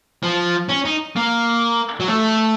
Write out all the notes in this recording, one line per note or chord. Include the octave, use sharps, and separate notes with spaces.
F3
C#4
D#4
A#3
F#3
A3